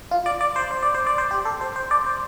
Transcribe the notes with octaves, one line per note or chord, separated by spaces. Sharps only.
F4
D5
D5
C5
C5
D5
C5
D5
C5
G4
A4
C5
C5
D5
C5